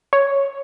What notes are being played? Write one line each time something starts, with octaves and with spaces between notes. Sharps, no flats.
C#5